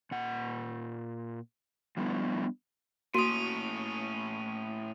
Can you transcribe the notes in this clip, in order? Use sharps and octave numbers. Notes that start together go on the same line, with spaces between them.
A#2 F#5
F3 G3 B3 D4 E4
A2 A#3 C#4 F#4 D#6 D#7